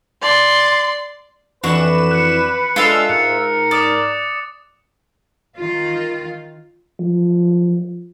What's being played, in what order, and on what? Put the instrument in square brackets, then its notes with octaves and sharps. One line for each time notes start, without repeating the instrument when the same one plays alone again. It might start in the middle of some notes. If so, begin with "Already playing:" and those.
[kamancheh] D5 C6
[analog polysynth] F2 E3 E7 [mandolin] D4 F#4 [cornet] B4
[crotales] F#6 C#7
[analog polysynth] G#3 D4 A4 [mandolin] F4 E5 F5
[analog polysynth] G#2 [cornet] A#4 [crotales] F#6 C#7
[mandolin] D5 [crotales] D6 D#6 A6
[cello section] D#3 F4
[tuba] F3